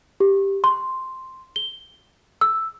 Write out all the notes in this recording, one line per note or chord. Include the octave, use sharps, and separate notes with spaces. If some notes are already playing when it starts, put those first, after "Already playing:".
G4
C6
G7
E6